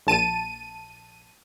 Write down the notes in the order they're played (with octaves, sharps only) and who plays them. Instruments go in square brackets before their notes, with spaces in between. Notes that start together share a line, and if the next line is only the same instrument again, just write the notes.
[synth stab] A#1 A5 D#7